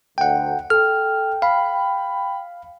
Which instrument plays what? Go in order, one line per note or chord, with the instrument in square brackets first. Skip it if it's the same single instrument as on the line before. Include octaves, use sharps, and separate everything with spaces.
[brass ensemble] D2 [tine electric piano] F#5 G5
[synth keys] A4 [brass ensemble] G5 [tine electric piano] F6
[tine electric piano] F5 [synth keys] B5